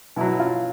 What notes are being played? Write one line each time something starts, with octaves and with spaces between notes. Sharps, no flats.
B2 F#3 E4
F4